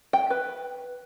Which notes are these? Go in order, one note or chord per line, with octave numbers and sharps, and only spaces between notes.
G5
B4